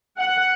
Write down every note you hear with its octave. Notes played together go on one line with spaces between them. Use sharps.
F#5